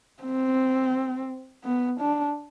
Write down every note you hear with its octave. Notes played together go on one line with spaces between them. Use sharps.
C4
B3
D4